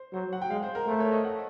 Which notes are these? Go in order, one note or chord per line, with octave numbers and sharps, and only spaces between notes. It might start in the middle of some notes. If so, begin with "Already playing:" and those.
Already playing: C5
F#3 C5
F#5
G5
G#3 F5
C5
A#4
A3 C5
C#5
D#5
F#5